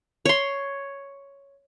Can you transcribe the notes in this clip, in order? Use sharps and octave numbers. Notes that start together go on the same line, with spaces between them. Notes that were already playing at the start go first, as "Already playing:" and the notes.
C#5 C6